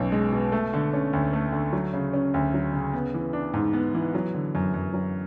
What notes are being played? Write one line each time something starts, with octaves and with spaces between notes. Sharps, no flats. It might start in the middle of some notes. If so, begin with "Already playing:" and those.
Already playing: B1 B2 C#4
G#3
B2
A3
D3
C#4
D2
A3
D3
F#3
C#3
C#4
D2
F#3
C#3
B3
E3
D4
G#2
B3
E3
F#3
D3
F#2
F#2
F#3